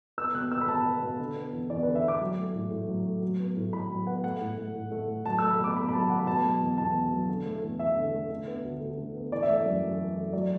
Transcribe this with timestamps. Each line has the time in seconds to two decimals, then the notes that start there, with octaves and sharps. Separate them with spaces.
0.18 B3 E6
0.34 B2 F#6
0.51 B3 E6
0.61 B5
0.68 B2 A5
0.85 B3
1.03 B2
1.20 D3
1.36 B3
1.53 E2
1.70 E2 D5
1.83 B4
1.87 D3
1.95 E5
2.04 B3 D6
2.20 F#3
2.38 A3
2.54 A2
2.72 A2
2.89 F#3
3.05 A3
3.22 F#3
3.39 B3
3.56 A2
3.73 A2 B5
3.90 F#3
4.07 B3 F#5
4.24 A3 F#5
4.41 A2
4.58 A3
4.75 A2
4.92 A3
5.08 A2
5.26 F#3 A5
5.39 E6
5.42 A3
5.51 B5
5.60 B2 D6
5.76 B2 B5
5.88 B5
5.93 F#3 A5
6.10 A3 F#5
6.19 B5
6.27 B2 A5
6.44 F#3
6.61 E2
6.78 E2 A5
6.95 B2
7.12 F#3
7.29 D3
7.46 A3
7.63 E2
7.79 E2 E5
7.97 D3
8.13 A3
8.30 D3
8.48 B3
8.64 D2
8.81 D2
8.98 D3
9.14 B3
9.32 E3 D5
9.43 E5
9.48 A3 D5
9.66 F#2
9.83 F#2
10.00 E3
10.17 A3
10.33 F#3 D5